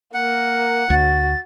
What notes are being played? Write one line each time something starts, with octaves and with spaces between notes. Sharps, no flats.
A#3 A#4 F#5
D2 F#4 A6